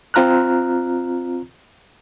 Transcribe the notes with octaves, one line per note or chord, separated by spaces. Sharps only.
C4 F4 A#5 F6 F#6